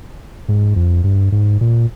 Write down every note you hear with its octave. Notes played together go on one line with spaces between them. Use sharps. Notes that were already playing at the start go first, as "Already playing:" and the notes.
G#2
F2
G2
G#2
A#2